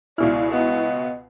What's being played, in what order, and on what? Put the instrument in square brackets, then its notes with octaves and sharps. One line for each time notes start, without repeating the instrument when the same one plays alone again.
[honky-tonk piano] C#2 B2 F6 [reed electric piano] E4 [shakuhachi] D5
[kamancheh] B3 [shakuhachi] D#5